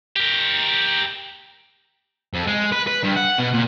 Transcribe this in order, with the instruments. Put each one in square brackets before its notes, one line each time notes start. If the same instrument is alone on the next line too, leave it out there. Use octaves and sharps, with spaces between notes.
[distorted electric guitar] G4 A#4
F2
G#3
B4
B4
G2
F#5
B2
A#2